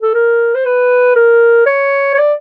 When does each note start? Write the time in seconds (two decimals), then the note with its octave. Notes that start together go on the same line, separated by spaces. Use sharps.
0.02 A4
0.14 A#4
0.54 C5
0.65 B4
1.15 A#4
1.66 C#5
2.14 C#5
2.18 D5